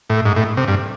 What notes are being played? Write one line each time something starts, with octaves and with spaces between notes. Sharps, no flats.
A2
G#2
A2
C3
G2